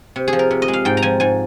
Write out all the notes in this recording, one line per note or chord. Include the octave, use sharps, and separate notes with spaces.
C3
G#4
F3
A#4
C3
D#5
G#3
F5
G#2 G5
A#5
F3 G#5
G#2 G#5